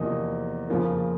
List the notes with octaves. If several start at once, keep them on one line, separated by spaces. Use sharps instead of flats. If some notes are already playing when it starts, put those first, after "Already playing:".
Already playing: E2 C3 F3 A#3 D#4
F2 C#3 F3 A#3